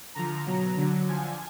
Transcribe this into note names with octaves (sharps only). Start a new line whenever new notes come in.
D3 F3 A#5
B2 F#3
D3 F#3
D3 F3 G#5